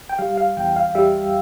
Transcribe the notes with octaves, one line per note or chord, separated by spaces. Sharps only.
G5
G3 F5
F5
E2 G5
F5
G3 E5